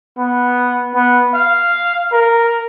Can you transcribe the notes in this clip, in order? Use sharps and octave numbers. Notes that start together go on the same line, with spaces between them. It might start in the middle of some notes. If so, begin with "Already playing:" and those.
B3
B3
F5
A#4